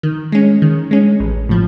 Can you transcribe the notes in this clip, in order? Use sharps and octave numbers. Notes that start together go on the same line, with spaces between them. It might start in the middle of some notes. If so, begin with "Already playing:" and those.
D#3
G#3 C#4
D#3
G#3 C#4
A1
A2 F3